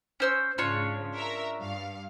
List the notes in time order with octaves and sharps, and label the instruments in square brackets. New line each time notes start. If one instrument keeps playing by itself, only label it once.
[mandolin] C#4 C5 E6
[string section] G#2 C#3 [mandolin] D4 F4 C#5
[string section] A#4 E5
G2 F5